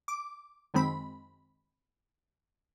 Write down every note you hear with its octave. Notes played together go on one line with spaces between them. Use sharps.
D6
F#2 D#3 G#3 C4 B5